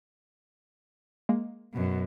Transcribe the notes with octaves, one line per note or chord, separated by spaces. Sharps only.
G#3 A#3
F#2 B2